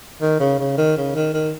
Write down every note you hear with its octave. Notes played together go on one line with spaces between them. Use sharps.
D#3
C#3
C#3
D#3
C#3
D#3
D#3